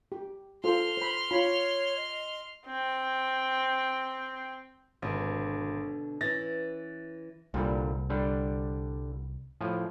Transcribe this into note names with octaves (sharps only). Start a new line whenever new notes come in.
G4
F4 A4 C5 C6 F6
C5 B5
F4 C#5 B5
D#5
C4 G5
G#1 B2 D3 D4
E3 C#4 A6 A#6
C2 A#2 D3 G3
D3 G3 D4
A2 F3 G#5